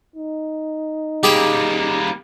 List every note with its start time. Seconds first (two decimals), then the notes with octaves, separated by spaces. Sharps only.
0.16 D#4
1.23 G3 A#3 G4 G#4 G5